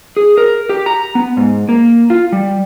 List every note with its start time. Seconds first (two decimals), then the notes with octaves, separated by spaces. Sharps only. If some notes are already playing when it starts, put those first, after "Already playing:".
0.17 G#4
0.38 A#4
0.69 G4
0.86 A#5
1.15 B3
1.37 G#2
1.69 A#3
2.10 F4
2.33 G3